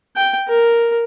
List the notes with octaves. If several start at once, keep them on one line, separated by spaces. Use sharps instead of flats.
G5
A#4